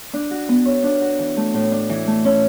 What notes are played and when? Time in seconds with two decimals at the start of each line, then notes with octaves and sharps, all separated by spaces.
0.14 D4
0.31 F#4
0.49 B3
0.65 C#5
0.83 D4
1.01 F#4
1.19 E3
1.37 A3
1.54 A2
1.72 D4
1.89 E3
2.07 A3
2.25 C#4